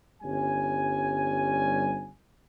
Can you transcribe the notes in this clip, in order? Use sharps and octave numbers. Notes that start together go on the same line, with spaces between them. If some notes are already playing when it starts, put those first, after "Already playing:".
G1 G3 C#4 G#5